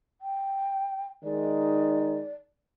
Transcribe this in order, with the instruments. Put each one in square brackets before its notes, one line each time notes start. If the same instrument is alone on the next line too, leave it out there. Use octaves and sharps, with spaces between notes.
[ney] G5
[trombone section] D#3 G#3 D#4 [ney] D5